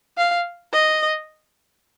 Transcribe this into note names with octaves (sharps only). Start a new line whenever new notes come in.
F5
D#5